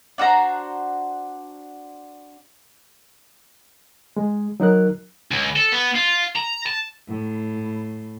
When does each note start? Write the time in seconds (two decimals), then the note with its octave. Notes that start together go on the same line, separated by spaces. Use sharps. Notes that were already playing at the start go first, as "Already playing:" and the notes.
0.18 D4 F#4 C5 A#5
4.17 G#3
4.60 F#3 D#4 A#4 F#6
5.31 C#2
5.56 A4
5.72 B3
5.95 F4
6.36 A#5
6.66 A5
7.09 A2